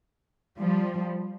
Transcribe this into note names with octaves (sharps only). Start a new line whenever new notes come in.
F3 G3